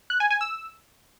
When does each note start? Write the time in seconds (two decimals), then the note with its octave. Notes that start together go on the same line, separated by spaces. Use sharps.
0.10 F#6
0.20 G#5
0.30 G#5
0.41 E6